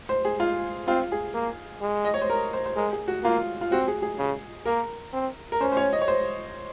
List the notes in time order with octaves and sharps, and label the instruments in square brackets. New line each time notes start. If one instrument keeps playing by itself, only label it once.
[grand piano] C5
G#4
F4
[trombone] C4 [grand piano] F4
[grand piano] G#4
[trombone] A#3
G#3
[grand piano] D#5
C#5
C5
A#4
C5
C5
[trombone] G#3 [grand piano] A#4
[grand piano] G#4
F#4
[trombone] A#3 [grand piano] F4
[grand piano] F4
[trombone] C4 [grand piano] F#4
[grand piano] G#4
G#4
[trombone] C#3
[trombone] A#3 [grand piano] A#4
[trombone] C4
[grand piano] A#4
[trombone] C#4 [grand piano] C5
[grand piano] C5
C#5
D#5
C#5
C5